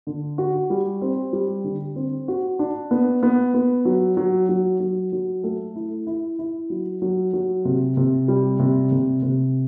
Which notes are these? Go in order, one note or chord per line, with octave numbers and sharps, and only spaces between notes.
D3
F#4
G3
C4
G3
D3
C4
F#4
D4
B3
B3
B3
F#3
F#3
F#3
F#3
F#3
A3
E4
E4
E4
F#3
F#3
F#3
C3
C3
G3
C3
C3
C3